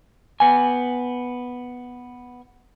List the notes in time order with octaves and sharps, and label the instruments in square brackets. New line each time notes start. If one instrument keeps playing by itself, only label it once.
[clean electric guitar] B3 G#5